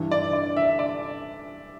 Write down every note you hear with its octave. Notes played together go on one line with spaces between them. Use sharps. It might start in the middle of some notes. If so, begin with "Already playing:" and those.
Already playing: G2 E3
D5
D5
E5
D5